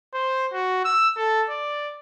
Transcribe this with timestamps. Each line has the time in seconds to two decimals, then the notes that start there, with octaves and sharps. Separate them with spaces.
0.14 C5
0.53 F#4
0.85 E6
1.17 A4
1.50 D5